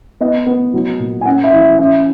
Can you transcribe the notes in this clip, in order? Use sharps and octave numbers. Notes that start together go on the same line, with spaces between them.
B3 D#5
B3
F#3
A#2
G#5
C#4 F#5
E5
E3
E5
C#4 E5